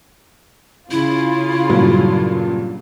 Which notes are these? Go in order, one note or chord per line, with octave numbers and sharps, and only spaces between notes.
C#3 E4 F4
G2 A#2 F#3